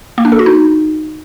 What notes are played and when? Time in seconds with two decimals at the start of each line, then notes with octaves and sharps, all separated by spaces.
0.18 A#3
0.25 D4
0.32 A4
0.39 F#4
0.46 D#4